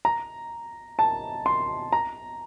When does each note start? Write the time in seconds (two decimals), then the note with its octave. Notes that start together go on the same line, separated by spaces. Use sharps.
0.05 A#5
0.99 A5
1.46 C6
1.92 A#5